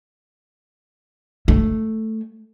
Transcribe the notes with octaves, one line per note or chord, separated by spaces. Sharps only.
A3